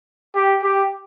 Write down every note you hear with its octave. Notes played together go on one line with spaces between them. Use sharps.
G4
G4